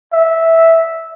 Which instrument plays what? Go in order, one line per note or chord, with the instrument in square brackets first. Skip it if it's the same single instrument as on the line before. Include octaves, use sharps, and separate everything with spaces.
[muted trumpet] E5